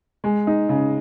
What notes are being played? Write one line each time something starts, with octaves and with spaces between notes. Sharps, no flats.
G#3
D#4
C#3